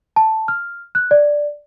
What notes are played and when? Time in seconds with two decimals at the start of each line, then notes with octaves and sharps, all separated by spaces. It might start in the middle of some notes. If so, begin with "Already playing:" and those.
0.16 A5
0.48 F6
0.95 F#6
1.11 D5